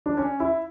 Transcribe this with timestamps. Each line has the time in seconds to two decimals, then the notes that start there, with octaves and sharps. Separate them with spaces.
0.06 D4
0.17 C#4
0.40 E4